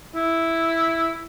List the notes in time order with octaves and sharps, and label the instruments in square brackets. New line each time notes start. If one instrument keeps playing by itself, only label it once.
[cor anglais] E4